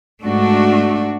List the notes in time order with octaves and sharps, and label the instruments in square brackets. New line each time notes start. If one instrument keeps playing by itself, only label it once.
[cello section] G#2 D4 F#4 [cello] A3